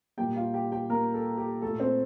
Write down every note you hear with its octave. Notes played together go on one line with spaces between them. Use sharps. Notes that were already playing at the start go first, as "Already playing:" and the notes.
A#2 G3 A#3 G4 G5
F4 F5
G4 G5
G4 G5
A#3 A#4
A4
G4
A#2 A3 A4
C4 C5